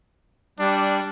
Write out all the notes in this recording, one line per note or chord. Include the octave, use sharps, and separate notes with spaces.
G3 D4